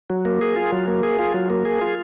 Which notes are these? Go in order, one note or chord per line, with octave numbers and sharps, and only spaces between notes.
F#3
A#3
G#4
F4
F#3
A#3
G#4
F4
F#3
A#3
G#4
F4